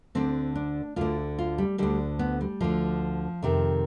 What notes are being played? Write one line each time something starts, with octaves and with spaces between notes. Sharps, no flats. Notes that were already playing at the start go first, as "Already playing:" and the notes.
D2 D3 C4
D4
D2 D3 F4
F4
G3
D2 D3 G3
B3
G3
D2 D3 F3
F2 C3 D#3